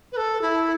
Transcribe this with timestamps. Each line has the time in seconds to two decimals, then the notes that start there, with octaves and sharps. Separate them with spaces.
0.12 B4
0.17 A4
0.41 E4